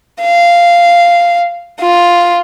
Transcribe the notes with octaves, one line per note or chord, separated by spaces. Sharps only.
F5
F4